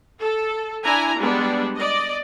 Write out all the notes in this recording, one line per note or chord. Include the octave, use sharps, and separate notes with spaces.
A4
D4 E4 G#5 A#5
G3 G#3 B3 D4
D5 D#5